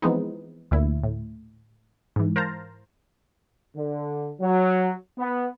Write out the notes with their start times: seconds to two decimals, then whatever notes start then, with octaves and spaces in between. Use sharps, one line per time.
0.02 E3 F3 G#3 B3 C4 D#4
0.71 D2 A#2 E4
1.03 A2
2.16 G#2 E3
2.36 A#4 C5 F5 A5 A#5
3.76 D3
4.41 F#3
5.18 B3